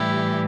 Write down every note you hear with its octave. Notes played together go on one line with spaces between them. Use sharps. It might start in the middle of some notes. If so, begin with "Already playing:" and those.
Already playing: A2 E3 G3 E4 G4